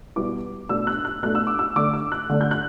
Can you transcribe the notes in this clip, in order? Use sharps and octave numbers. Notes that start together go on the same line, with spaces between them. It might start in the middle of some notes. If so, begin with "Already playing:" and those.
B2 G3 B3 E4 D6
B2 A3 D4 E6
F#6
F#6
B2 A3 D4 F#6
E6
D6
E6
D3 A3 D4 D6
E6
F#6
D3 A3 D4
G6
F#6